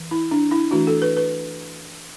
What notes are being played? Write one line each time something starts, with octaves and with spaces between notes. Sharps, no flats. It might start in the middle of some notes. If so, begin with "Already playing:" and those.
Already playing: E3
E4
D4
E4
E3 A3 D4 F#4
A4
B4
B4